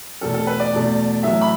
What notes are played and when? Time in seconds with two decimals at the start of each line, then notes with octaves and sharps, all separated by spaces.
0.21 E2 B2 A3 A4
0.34 A4
0.47 B4
0.60 D5
0.73 E2 B2 A3
1.23 A1 A2 F#3 A3 E5
1.41 B5